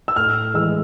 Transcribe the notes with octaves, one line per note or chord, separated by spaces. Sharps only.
E6
A2 F6
E3 G#3 E6